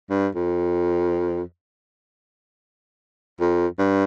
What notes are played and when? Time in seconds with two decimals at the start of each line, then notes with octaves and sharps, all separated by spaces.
0.10 G2
0.35 F2
3.40 F2
3.79 G2